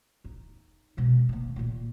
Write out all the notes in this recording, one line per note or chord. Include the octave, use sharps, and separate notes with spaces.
D#4
B2 G#3
D#3 A#3
A#2 A#3